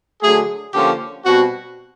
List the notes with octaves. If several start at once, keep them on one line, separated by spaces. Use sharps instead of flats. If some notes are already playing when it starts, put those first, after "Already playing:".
D3 F#3 A3 G#4
D3 F3 A#3 C#4 F4 G4
B2 G3 C4 F#4